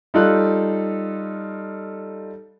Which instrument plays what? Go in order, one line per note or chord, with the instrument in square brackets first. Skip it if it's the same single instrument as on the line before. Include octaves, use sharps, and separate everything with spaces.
[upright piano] G3 D#4 F4 A4 F#6